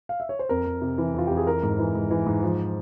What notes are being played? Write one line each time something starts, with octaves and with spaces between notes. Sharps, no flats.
F5
E5
C#5
C5
F2 A#4
F2
C3
E3
F2 F4
F2 G4
G#4
E3 A#4
G#2
E3
G#2
E3
G#2
F3